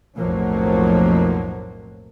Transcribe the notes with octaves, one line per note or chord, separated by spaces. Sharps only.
B1 F2 A2 F3 F#3 A#3